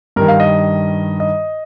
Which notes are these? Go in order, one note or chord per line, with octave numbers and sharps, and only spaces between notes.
G2 D#3 A#4
F5
D#5
D#5